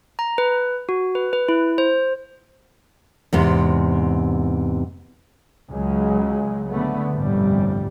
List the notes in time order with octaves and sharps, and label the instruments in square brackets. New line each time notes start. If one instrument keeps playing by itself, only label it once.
[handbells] A#5
B4
F#4
B4
B4
E4
C5
[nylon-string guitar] E2 G#2 C3
[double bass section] C#2 C#3 F#3 G#3
D3 A3 B3
G1 C2 F2 A2 G3